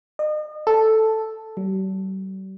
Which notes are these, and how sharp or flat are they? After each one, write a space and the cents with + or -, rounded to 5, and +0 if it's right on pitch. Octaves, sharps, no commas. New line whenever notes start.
D#5 -35
A4 +0
G3 -45